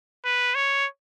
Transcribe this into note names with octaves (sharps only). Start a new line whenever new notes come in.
B4
C#5